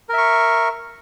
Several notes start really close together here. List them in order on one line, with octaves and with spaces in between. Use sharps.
A#4 E5 C#6